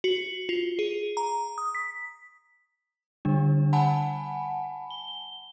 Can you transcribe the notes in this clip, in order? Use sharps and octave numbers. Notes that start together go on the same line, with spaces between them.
F#4
F4
G#4
A#5
D#6
B6
D3 G3 D4
F#5 G#5 A5 B5
G7